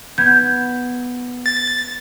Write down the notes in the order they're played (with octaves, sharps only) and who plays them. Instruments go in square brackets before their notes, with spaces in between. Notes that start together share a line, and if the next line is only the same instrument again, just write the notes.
[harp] B3 [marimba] G6 G#6
[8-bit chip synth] A6